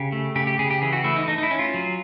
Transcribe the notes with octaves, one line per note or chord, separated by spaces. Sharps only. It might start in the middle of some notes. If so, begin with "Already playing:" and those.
Already playing: C#3 G4
A3
C#3 G4
G4
C#3 G#4
G4
E3 G#4
F#4
A3 E4
D#4
A3 D#4
D#4
E4
C#4
F4
F#3